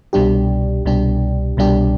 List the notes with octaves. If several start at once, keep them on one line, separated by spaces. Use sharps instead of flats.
C2 B2 G3 D4 G4
C2 B2 G3 D4 G4
C2 B2 G3 D4 G4